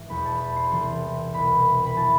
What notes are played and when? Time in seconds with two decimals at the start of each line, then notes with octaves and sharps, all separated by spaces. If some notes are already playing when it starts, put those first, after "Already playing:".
Already playing: G#2 E3
0.09 E2 B2 B5
0.25 A5
0.40 B5
0.56 C6
0.71 C2 C3 E3 C6
1.34 C2 B2 B5
1.86 B5
1.97 E3 A5